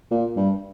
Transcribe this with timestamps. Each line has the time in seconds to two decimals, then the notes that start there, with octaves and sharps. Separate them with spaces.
0.11 A#2
0.36 G2